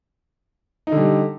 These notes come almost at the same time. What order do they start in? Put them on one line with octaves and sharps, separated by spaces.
D#4 D3 G3